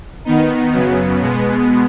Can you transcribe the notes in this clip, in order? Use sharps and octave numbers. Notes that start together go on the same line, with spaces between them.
D#3 B3 D#4
F#2 C#3 F#3 B3
B2 G#3 B3